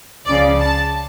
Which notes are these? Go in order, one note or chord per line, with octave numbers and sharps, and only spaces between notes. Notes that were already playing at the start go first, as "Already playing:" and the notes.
C#2 C#3 F3 D5
A5